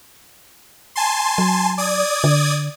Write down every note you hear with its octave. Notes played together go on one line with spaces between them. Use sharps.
G#5 A5 C6
F#3
D5 D#6 G#6
D3